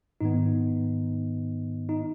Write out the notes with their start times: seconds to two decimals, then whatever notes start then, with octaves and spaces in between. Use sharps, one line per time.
0.21 G#2 D#3 B3 D#4
1.89 D#4